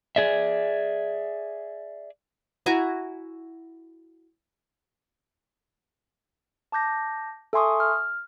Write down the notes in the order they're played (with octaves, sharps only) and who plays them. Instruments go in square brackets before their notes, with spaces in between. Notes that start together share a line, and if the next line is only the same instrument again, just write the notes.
[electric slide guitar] G#4 D5 E5
[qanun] E4 F#4 G#5 A#5
[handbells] A5 D6 G6 A#6
A4 E5 G#5 C6 C#6 D#6
F6